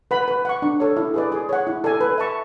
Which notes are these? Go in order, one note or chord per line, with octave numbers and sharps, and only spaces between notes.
B4 F#5 B5
B4
F#5 C#6
D4
A4 C#5
E4
G#4 B4 D5
G#4
C#5 F#5
E4
A4 D5 G#5
B4
E5 A5 C#6